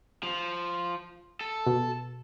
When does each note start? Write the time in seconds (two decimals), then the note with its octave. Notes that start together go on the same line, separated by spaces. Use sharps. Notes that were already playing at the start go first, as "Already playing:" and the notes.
0.23 F3
1.41 A4
1.67 B2